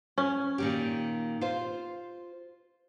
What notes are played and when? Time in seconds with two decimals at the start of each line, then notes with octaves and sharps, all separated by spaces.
0.18 C#4
0.58 A#2 D#3 G4
1.41 F4 C5